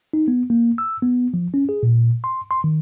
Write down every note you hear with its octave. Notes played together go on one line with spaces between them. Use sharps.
D#4
B3
A#3
E6
B3
F3
C#4
G#4
A#2
C6
C6
D#3